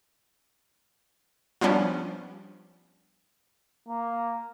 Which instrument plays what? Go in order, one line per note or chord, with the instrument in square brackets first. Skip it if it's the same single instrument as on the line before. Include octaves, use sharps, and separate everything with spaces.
[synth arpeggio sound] F3 G3 B3 C#4 D4
[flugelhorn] A#3